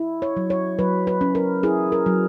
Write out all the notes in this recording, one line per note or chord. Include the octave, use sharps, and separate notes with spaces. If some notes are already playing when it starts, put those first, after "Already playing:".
Already playing: E4
C#5
F#3
C#5
F#3 B4
B4
C#4
A#4
E4 G#4
A#4
F#3